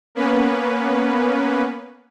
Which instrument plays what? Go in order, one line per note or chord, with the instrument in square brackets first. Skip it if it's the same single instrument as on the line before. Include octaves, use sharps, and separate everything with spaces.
[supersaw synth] A#3 B3 C#4 B4